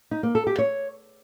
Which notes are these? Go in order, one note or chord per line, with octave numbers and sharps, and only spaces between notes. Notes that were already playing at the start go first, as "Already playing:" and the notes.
D#4
A#3
A4
G4
C#5